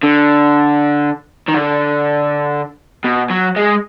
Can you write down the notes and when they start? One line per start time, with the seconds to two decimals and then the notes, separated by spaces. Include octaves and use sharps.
0.03 D3
1.49 D#3
1.55 D3
3.05 B2
3.30 F#3
3.56 G#3